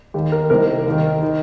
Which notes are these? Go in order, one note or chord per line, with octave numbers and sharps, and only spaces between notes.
D#2 D#3 G4
A#4
C2 C3 D#3 A#4
D#2 D#3
D#3